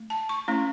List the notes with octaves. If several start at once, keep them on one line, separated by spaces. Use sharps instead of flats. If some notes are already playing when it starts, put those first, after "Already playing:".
Already playing: A3
A5
C#6
A3 C#4 E4